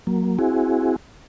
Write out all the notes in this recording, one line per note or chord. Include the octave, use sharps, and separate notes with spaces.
F#3 A#3
C4 E4 F#4 G#4